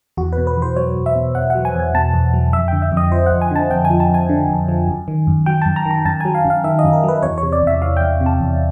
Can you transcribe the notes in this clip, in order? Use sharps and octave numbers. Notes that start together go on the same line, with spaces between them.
E2 F#4
B4
B2
B4
E2 C5
F#3 C#5
E2
E5
B2
E2 F#5
F#3 F#5
G#5
E2 G#5
B2 A5
E2
F#3
F2 E5
D3 G5
E5
F2 D#5
F3 C5
F2 F#5
G#5
D3 A5
F2 G5
G#5
F3
A5
F2 G#5
D3
F2
F3
F#2
D#3
F#2
F#3 G5
F#2 A5
A#5
D#3
A#5
F#2 A5
F#3 G#5
F5
F#2
F5
D#3 E5
D#5
F#2
A#4
F#3 B4
E2 C#5
C#5
C3
D5
E2 E5
E3 F5
E2 G5
C3
A5
E2